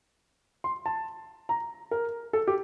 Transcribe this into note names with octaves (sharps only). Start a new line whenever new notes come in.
C6
A5
A#5
A#4
A4
G4